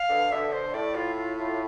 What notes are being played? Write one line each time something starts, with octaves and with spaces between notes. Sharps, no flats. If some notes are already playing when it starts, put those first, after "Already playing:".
Already playing: F5
B2 D3
B2 D3 E5
C5
A2 D5
F4
F4
F4